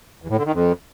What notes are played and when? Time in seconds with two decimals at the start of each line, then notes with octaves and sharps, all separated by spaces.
0.22 E2
0.30 A2
0.38 D3
0.45 D#3
0.53 F2